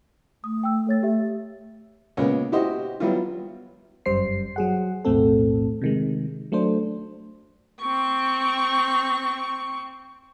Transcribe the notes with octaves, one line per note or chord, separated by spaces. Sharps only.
A3 D#6
G5 E6
A4 C#5 A6
G4 E5
A#2 C#3 G#3 B3 C#4
E4 F#4 G4 C5 D#5
F#3 G3 B3 E4 F4
G1 F#2 G3 C5 C7
F#3 G#4 F#5
B1 E2 A2 A3 C4 A4
C3 D#3 G#3
F#3 A3 D4 C5
C4 C#6